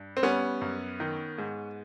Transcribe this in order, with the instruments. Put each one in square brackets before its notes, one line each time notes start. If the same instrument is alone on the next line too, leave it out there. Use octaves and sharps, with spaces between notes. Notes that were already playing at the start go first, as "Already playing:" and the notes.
Already playing: [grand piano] G2
C4
G3 B3 C#4
F#2
D#3
G#2